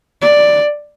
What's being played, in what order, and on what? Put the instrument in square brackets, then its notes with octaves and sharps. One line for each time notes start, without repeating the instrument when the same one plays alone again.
[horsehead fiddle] D5